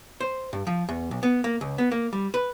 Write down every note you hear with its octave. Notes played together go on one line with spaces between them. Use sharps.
C5
G2
F3
E2
B1
B3
A#3
C#2
B3
A#3
G3
B4